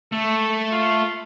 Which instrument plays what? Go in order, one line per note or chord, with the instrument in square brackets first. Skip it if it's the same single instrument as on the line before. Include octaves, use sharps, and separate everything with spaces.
[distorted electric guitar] A3 [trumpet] A4
[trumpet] F4